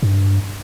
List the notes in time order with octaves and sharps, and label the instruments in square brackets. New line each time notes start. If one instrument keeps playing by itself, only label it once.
[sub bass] G2